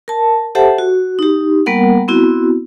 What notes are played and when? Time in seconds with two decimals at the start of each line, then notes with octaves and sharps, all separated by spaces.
0.08 A#4 A5
0.55 G4 A4 C5 E5 F#5 A5
0.78 F#4
1.19 D#4 G4
1.66 G3 A#3 B3 A#4 F#5
2.08 B3 C4 E4 F#4